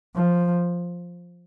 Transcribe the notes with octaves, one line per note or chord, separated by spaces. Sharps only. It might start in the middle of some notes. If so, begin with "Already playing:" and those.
F3